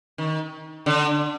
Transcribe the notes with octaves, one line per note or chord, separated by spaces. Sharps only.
D#3
D3